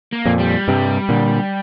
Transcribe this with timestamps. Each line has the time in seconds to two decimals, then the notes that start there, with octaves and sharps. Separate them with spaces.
0.13 A#3
0.26 F2 A#2
0.39 G3
0.68 G2 C3
1.09 A#2 D3